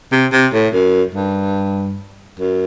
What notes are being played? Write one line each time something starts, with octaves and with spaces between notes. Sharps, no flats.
C3
C3
A2
F#2
G2
F#2